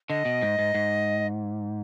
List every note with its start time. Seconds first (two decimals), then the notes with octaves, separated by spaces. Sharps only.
0.10 D3 D#5
0.25 B2
0.42 G#2
0.59 G#2
0.74 G#2